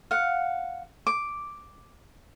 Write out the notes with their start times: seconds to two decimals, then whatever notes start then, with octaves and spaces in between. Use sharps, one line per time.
0.11 F5 F#5
1.07 D6